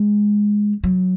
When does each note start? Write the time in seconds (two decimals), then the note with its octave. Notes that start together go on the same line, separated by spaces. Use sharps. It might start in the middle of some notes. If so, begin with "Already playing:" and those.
Already playing: G#3
0.84 F#3